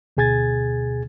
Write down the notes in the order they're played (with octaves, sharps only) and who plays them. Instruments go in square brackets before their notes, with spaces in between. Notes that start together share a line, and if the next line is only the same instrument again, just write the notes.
[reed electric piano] D2 B2 G#4 G#5 G#6 A6